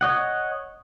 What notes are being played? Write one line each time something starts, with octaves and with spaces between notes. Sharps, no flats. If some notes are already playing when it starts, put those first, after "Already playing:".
C#5 D#5 F#5